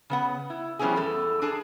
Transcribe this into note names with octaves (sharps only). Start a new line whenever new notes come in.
C#3 B3 F#5
E4
F3 G3 B3 C#4 E4 G#4
E2 A4
D4 G#4 A5